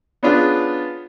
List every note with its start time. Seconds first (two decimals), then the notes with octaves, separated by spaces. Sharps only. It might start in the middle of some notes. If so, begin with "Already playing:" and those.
0.23 B3 C#4 D4 F4 G#4